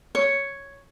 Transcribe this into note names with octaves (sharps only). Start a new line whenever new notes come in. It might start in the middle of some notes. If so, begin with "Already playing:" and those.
C#5